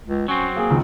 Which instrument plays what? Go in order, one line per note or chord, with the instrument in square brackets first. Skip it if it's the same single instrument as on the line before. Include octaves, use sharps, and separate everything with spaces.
[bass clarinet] C#2
[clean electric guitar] F#3 C4 [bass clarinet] C#4
[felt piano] A#3 [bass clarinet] G#4
[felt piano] C#2 D#3